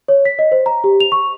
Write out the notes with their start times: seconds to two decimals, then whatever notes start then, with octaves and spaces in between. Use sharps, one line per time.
0.08 C#5
0.25 B6
0.39 D#5
0.52 C5
0.66 A#5
0.84 G4
1.00 F7
1.12 C#6